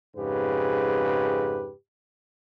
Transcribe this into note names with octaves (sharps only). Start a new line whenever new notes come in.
F2 G#2 C#3 G4 B4